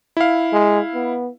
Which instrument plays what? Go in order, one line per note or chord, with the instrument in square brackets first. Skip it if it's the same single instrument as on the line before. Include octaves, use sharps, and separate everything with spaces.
[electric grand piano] E4 F5
[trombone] G#3
B3